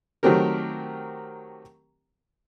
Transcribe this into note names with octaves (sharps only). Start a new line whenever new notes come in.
D#3 F#3 A3 C4 G4 A#4